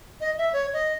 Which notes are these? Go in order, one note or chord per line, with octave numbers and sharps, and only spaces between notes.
D#5
E5
C#5
D#5